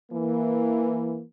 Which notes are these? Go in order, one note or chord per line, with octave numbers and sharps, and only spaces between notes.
E3 A#3